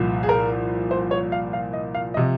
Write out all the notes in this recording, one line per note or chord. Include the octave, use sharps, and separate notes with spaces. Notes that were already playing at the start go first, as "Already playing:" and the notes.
Already playing: C2 A#2 F3
G#4
A#4
C5
C#5
F5
F5
D#5
F5
D#5
C3 F3